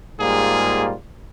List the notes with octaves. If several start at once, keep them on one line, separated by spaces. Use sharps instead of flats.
G#2 G3 A#3 F4 G#4